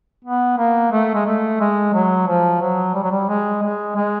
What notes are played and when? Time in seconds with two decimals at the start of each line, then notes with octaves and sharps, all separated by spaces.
0.25 B3
0.58 A#3
0.92 A3
1.15 G#3
1.26 A3
1.61 G#3
1.94 F#3
2.27 F3
2.61 F#3
2.94 G3
3.04 F#3
3.11 G3
3.29 G#3
3.63 G#3
3.96 G#3